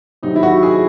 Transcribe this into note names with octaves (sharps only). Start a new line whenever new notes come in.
C3 D#3 F#3 D#4
E4
F#4
G#4